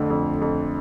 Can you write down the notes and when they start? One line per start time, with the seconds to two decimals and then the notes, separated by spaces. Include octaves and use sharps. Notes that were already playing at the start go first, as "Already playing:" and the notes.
Already playing: F2 D3 A3
0.10 F2
0.42 F2